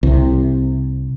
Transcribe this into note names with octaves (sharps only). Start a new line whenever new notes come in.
C2 C3